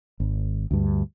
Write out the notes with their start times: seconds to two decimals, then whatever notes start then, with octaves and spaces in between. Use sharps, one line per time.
0.20 G#1
0.71 D2 G2